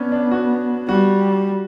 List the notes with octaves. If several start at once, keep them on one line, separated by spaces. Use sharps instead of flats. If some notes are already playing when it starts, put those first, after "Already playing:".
Already playing: B3 C#4 D4
D4
F#4
G3 F#4